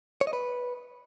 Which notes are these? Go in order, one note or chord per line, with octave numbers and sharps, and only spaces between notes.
C#5
D#5
B4